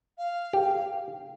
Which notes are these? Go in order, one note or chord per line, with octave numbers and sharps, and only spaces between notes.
F5
G4